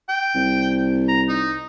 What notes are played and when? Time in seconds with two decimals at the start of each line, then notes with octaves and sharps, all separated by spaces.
0.09 G5
0.35 C2
1.09 A#5
1.29 D#4